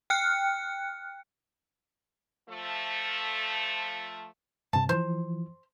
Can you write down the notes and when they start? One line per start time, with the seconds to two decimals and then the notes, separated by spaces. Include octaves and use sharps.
0.10 G5 F6 F#6 C#7
2.49 F3 A3
4.73 G2 C3 A5
4.89 E3 F3 C5